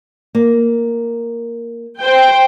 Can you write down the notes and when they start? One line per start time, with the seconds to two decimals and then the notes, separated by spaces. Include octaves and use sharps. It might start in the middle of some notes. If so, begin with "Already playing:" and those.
0.35 A#3
2.01 C5 G5